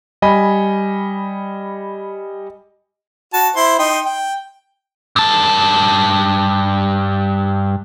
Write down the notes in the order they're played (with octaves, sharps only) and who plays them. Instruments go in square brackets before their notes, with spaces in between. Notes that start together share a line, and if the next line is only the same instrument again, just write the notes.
[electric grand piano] G3 D#5 G#5 B5
[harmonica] F#4 A5
E4 C5 C6
D#4 G5 C6
G5
[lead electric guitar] G2 A5